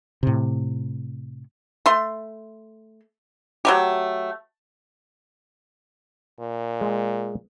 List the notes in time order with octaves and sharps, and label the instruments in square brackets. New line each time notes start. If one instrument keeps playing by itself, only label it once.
[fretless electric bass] A2 C3
[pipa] A3 C6
F#3 A3 G4
[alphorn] A#2
[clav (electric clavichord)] G#3